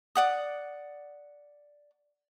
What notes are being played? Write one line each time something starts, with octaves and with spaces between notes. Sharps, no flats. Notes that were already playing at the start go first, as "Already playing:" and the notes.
D5 F#5 D#6